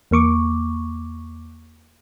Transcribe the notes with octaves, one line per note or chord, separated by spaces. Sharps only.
E2 A#3 C#6 D6